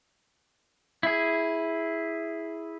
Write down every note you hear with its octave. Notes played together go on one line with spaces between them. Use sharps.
E4 G#4